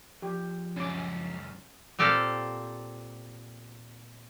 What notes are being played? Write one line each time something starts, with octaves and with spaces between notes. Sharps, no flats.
F3 F4 G4 G#4
C#2 F#2 C#4 D6
A#2 C4 G4 A4 F5